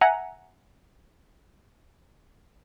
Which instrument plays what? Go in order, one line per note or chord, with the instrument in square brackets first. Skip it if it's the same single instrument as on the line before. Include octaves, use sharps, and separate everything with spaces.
[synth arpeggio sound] E5 F#5 G#5 A#5